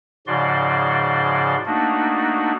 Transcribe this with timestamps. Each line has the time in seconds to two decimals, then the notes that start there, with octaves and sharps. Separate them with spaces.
0.27 G#2 C#3 F3 F#4 D5 C6
1.66 A3 A#3 D4 D#4 F#4